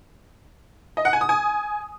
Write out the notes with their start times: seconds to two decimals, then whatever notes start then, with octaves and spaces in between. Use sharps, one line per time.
0.97 D#5
1.05 F#5
1.13 G#5
1.21 D#6
1.29 G#5